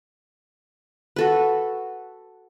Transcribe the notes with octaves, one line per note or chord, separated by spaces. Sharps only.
F#4 A4 B4